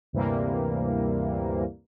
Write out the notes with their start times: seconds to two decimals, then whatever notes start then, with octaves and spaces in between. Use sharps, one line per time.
0.13 D2 G2 C3 E3 G3 A#3